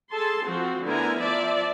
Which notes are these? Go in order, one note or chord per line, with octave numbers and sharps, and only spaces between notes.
G#4 A4 A5 C6
F3 C4 F#4
D3 A3 B3 E4 A#4 G#5
F3 D5 E5 A5